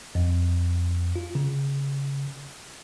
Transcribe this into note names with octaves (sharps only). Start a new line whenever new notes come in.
F2
F4
C#3